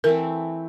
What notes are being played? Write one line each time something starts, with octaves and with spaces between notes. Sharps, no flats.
E3 A3 C4 A#4